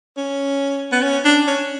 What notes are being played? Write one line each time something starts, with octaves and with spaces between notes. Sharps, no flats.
C#4
B3
C#4
D4
C#4